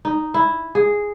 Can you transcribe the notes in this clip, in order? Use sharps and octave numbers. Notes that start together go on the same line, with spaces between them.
D#4
E4
G#4